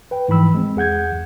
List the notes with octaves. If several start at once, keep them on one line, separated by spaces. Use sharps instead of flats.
B4 G5
G#2 E3 F3 B5 E6
G#3 C4
E2 G#4 F#5 G6 G#6